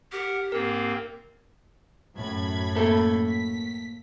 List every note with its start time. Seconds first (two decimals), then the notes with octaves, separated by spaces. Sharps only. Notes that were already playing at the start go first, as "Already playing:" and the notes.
0.12 G4 A#4 F#5
0.52 G#2 A#3 C4 A#4
2.16 F#2 A2 B5 G#6
2.76 A#3 A4
3.28 B6